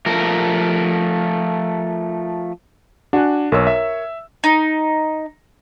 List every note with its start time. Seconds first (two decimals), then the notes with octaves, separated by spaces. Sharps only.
0.06 F3 A3 A#4
3.13 D4 F#4 G#5
3.52 B1 A#4 C#5 E6
3.67 E5
4.44 D#4